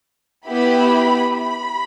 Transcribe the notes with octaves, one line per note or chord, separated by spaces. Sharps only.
B3 E4 G4 B5
B5